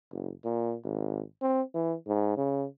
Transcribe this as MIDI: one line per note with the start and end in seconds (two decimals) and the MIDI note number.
0.11 0.32 30
0.44 0.76 46
0.84 1.22 32
1.42 1.62 60
1.74 1.95 52
2.07 2.34 44
2.37 2.66 49